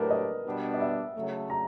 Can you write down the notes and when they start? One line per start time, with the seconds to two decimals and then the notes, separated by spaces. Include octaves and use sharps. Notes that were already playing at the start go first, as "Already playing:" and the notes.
Already playing: A2 F#3 A3 D4 G4 A#4 B4
0.10 D#5
0.46 B2 G3 B3 D4
0.74 D#5
0.80 E5
1.14 C#3 F#3 A3
1.50 A#5